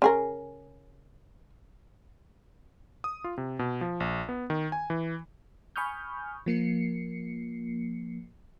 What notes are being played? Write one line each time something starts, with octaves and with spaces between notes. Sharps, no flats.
C#3 G#4 A#4
D#6
F4
C3
B2
F3
A#1
B3
D#3
G#5
E3
G#5 B5 C#6 D#6 F6 G6
F3 A#3 C7 C#7